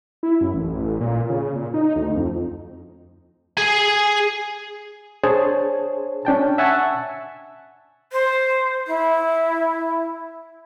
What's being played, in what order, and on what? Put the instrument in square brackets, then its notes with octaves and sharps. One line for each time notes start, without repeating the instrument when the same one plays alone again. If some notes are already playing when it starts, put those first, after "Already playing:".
[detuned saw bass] E4
F#2
A1
A#2
C#3
A#2
D#4
D2
F2
[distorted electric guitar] G#4 G#5
[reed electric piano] D4 G#4 C5 C#5 A5
C#4 D4 G5 A5
E5 F#5 G#5 A5 C#6 E6
[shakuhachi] C5
E4